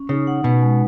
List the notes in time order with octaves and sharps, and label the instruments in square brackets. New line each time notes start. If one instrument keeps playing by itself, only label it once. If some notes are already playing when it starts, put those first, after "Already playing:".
Already playing: [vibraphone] C#4
[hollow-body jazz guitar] C#3 [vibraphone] D#4
[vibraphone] F#5
[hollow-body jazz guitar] B2 [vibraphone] B4
[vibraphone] G#3